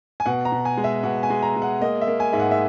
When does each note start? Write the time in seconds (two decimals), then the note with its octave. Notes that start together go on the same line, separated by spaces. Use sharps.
0.20 G#5
0.26 B2 F#5
0.45 A#5
0.52 B2
0.65 G#5
0.77 G#3
0.84 E5
1.03 B2 F#5
1.23 G#5
1.30 G#3
1.43 A#5
1.56 G#3
1.62 F#5
1.81 A#3 D#5
2.01 E5
2.07 A#3
2.20 G#5
2.33 G#2 E5
2.40 F#5
2.51 E5